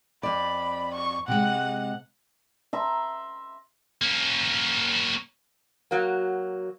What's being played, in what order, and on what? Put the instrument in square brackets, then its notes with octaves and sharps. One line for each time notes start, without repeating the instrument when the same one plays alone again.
[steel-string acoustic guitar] F2 D5 [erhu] B5
[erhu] C#6
[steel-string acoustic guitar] C3 G#3 [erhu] F#5
[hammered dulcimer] E5 A#5 C6
[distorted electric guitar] A#3 C#4
[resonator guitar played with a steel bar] F#3 A#3